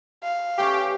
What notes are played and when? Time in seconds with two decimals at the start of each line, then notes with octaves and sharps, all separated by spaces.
0.23 F5
0.58 E3 A3 C#4 G4